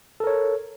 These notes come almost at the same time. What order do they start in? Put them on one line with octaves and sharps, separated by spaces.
A4 A#4 C#5